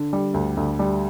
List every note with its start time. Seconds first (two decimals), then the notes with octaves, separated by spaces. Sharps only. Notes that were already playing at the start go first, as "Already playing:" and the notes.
Already playing: D3
0.13 G3
0.34 D2
0.57 D2
0.79 G3